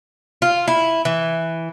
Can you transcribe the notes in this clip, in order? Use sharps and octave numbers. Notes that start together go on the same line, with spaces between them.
F4
E4
E3